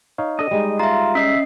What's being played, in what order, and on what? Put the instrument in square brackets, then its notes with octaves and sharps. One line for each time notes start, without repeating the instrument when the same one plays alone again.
[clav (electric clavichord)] D#4 C#5 F5
[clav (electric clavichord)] D4 A4 [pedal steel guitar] D#5
[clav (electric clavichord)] G3 G#3 D#4
[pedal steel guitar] F4 [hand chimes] E5 A#5
[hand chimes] C#4 D#5 C7 [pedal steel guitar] E5